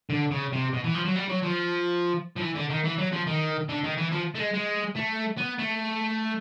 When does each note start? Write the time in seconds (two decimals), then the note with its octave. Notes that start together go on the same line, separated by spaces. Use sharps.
0.10 D3
0.31 C#3
0.52 C3
0.73 B2
0.84 E3
0.94 F3
1.05 F#3
1.16 G3
1.29 F#3
1.43 F3
2.37 F3
2.42 E3
2.56 D3
2.71 D#3
2.85 E3
2.98 F#3
3.12 F3
3.27 D#3
3.69 D3
3.83 D#3
3.97 E3
4.11 F3
4.35 A3
4.39 G#3
4.53 G#3
4.96 A3
5.38 B3
5.59 A3